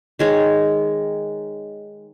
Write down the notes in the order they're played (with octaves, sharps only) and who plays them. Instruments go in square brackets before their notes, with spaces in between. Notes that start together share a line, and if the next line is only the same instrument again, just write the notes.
[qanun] D#3 G#3 C#5